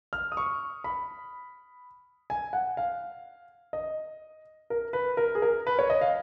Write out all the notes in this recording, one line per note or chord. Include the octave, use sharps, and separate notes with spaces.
F6
D#6
C#6
B5
G#5
F#5
F5
D#5
A#4
B4
A#4
G#4
A#4
B4
C#5
D#5
F5